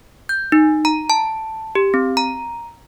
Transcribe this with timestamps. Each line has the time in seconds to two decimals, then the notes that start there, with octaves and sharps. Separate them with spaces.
0.29 G6
0.52 D#4
0.85 A#5
1.10 A5
1.75 G4
1.94 C4
2.17 A#5